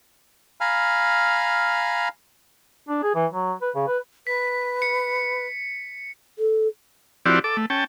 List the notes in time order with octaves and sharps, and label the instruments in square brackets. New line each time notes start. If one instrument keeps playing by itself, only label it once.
[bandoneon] F5 G#5 A#5 B5 F6
[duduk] D4
G#4
E3
F#3
B4
C#3
B4
[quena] B4 [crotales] B6
[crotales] C#7
[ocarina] A4
[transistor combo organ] F3 C4 E4 F#4 G4 D5
A4 D6
A3
C#4 G5 A5